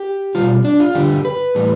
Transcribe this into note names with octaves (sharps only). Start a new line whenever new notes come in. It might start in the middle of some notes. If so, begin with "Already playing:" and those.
Already playing: G4
B2 G3 F4
D4
F4
G2 D3 F3 G4
B4
A2 E3 G3